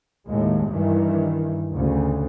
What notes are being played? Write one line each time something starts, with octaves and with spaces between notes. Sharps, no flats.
D#2 A2 G#3
G2 D#3 E3
D2 C#3